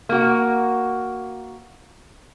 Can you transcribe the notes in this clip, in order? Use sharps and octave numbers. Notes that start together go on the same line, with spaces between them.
A#3 F#4